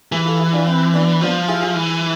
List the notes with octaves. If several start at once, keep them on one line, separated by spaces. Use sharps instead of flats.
E3 E4 G#4
F4 A4
E4 G#4
D4 F4
C4 E4
B3 D4
F3 B3 D4
E4 G#4
E4 G#4
E3